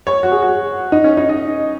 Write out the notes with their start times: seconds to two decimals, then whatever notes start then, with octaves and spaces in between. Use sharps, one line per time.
0.07 C#5
0.23 F#4
0.31 G#4
0.43 F#4
0.92 D#4
1.04 C#4
1.17 D#4
1.29 D#5